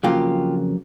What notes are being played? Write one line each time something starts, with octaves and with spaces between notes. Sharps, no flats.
F2 C#3 F#3 A#3 F4 G4